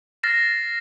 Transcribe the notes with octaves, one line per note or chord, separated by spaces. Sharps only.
F6 A6 A#6 C7 E7